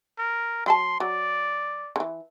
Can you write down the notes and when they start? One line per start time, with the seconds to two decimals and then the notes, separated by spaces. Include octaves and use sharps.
0.19 A#4
0.66 F#3 G4 A5 C6
1.00 F#3 D5
1.96 D3 E3